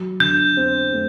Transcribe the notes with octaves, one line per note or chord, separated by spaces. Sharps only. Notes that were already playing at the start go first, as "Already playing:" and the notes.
Already playing: F#3
D3 G6
C4
A3